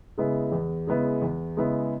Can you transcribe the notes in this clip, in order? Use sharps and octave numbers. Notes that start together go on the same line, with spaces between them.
C#3 G#3 B3 E4
E2
C#3 G#3 B3 E4
E2
C#3 G#3 B3 E4